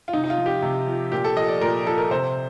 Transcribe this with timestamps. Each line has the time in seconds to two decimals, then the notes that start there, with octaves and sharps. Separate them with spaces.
0.08 F4
0.13 C3 D#4
0.24 D#4
0.30 F4
0.38 F3
0.46 G4
0.62 C3
0.87 F3
1.11 A#2 G4
1.24 A4
1.36 F3 D#5
1.49 D5
1.61 A#2 A#4
1.86 F3 A4
1.98 A#4
2.11 C3 C5